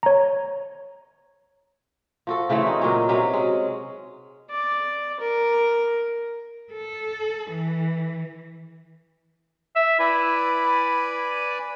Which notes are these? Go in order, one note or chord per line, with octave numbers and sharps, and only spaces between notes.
C#5 A#5
F3 F#4 A4
C#3 E3 A3 C4
D#4 D#5
A#2 F#3 C#4
C3 F#3 C#4 B4
G#3
D5
A#4
A4
E3
E5
E4 B4 D5 G#5